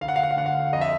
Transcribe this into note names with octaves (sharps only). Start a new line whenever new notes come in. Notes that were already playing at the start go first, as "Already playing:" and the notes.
D2 F5
F#5
F5
F#5
F5
D3 F#5
F5
F2 D#5
E5